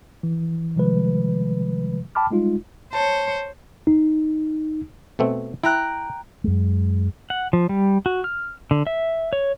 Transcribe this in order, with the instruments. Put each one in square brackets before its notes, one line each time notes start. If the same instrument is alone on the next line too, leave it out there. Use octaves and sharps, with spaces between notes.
[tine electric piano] E3
C3 D#3 F3 G3 G#3 B4
G5 A5 B5 D6 F6
G3 G#3 D#4 F4
[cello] C5 C#5 [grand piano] A5
[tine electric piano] D#4
[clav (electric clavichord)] B2 A3 C4
[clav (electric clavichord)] E4 [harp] G5 A#5 F#6
[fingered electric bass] F#2 G#3
[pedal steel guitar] F#5
F3
G3
F#4
F6
D3
E5
C#5